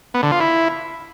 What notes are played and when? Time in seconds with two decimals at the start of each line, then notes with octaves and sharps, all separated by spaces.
0.14 B3
0.23 D3
0.32 F4
0.40 E4